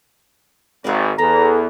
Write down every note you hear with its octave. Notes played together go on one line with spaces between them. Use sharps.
G#1 G#4 A#4 D5
E2 A4 A#5